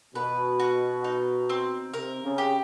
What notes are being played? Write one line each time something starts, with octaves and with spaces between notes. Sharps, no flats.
B2 B4
F#4
D#4
C4
C3 A#4
C#3
G4